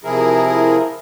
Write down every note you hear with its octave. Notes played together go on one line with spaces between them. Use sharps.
C3 E3 F3 E4 G#4 A#4